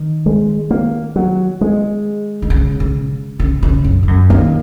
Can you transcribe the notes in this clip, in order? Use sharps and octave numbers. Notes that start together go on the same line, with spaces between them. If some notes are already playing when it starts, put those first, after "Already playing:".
Already playing: D#3
G#3
A#3
F#3
G#3
D#3
C#3
C#3
C#3
C#3
F#2
G#2
F#2
D#3 A#3